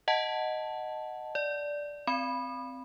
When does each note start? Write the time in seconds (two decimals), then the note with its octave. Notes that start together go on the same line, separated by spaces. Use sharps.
0.08 D#5 F#5 A5
1.35 D5
2.07 C4 B5